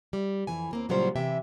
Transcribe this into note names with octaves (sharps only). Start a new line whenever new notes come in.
G3
F2 E3 G#5
D#2 A#3 C4
A#2 C#3 F#3 G3 F4 C5
C3 E3 G4 E5 G5